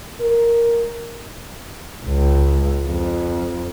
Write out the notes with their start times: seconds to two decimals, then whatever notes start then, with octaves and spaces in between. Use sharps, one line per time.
0.21 A#4
2.06 C#2
2.87 F2